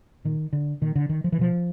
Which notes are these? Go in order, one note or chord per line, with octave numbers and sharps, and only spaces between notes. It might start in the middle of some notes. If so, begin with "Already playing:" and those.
A#2 D#3
D3
A#2 D#3
D3
D#3
F3
E3
B2 F3